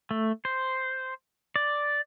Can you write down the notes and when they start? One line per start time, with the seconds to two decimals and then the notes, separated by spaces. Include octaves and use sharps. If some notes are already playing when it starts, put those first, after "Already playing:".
0.11 A3
0.45 C5
1.56 D5